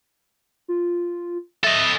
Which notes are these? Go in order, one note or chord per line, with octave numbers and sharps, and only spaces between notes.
F4
A4 D#5 E5